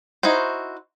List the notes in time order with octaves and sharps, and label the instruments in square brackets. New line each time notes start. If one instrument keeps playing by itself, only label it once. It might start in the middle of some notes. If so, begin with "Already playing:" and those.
[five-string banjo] D#4 E4 F#4 C5